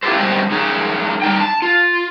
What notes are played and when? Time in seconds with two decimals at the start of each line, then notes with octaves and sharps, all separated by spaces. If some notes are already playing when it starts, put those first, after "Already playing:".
0.03 E4 F4 G4 A4 C5
0.17 F#2 B2 G3 C5 D#5 G5
0.50 F#2 D#4 G#4 C#5
1.22 G3 A#3 D#4 G5
1.40 A5
1.62 F4